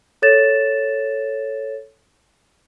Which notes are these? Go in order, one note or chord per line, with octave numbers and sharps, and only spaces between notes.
A4 C#5 A6 E7